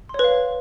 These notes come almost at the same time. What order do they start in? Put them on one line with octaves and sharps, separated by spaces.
C6 C#5 B4 F5